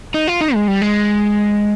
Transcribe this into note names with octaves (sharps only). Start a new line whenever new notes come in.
D#4
F4
D#4
G#3
G3
G#3